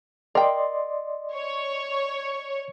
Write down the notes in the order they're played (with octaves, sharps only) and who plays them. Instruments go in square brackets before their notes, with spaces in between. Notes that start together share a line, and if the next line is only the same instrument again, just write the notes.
[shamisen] A#4 G5 [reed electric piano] D5 D#5 C6
[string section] C#5